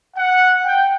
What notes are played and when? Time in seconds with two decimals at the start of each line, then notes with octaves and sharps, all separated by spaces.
0.17 F#5
0.65 G5